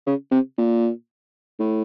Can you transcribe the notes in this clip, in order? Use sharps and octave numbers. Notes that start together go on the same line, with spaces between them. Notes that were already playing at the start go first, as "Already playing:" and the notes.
C#3
C3
A#2
A2